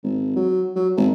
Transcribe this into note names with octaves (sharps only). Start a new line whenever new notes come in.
G#1
F#3
F#3
G#1